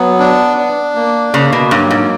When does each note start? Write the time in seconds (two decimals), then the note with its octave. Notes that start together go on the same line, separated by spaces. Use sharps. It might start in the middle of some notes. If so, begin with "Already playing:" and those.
Already playing: F#3 B3
0.19 D4
0.57 D4
0.95 A#3
1.33 C#3 A#3
1.53 B2
1.71 G2 F#3
1.91 G#2